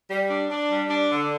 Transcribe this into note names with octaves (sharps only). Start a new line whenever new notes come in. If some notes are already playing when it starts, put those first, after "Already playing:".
G3
D4
D4
G3
D4
D3